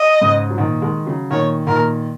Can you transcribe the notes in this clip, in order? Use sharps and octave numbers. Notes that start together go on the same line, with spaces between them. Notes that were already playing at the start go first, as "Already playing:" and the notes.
Already playing: D#5
G#2 C#3
F#3
A#2 D#3
D#3 G#3
C#3 F#3
A#2 D#3 C#5
A#2 D#3 A#4